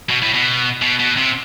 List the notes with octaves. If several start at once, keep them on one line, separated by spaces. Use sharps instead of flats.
B2
A2
B2
B2
B2
C3